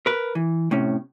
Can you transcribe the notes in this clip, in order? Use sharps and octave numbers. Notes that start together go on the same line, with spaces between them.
A#4 B4
E3
A2 C3 C#4